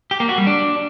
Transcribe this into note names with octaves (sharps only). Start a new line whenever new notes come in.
G4
A#3
F#4
G3
D4